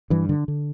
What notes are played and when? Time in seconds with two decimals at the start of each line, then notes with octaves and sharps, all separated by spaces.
0.10 G2 E3
0.29 D3
0.48 D3